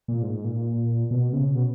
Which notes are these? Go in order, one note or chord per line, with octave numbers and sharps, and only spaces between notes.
A#2
G#2
A#2
B2
C#3
B2